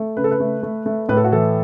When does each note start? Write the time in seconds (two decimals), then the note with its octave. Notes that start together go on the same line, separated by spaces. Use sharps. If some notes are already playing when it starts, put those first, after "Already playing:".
Already playing: A3
0.17 C#3 B4
0.24 A4
0.31 B4
0.40 A3
0.63 A3
0.86 A3
1.09 A2 B4
1.17 A4
1.24 F#4
1.32 E3 A4